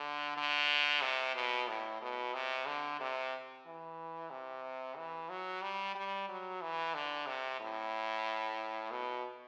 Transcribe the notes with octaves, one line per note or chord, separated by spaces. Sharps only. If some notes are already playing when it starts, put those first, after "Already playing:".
Already playing: D3
D3
C3
B2
A2
B2
C3
D3
C3
E3
C3
E3
F#3
G3
G3
F#3
E3
D3
C3
A2
B2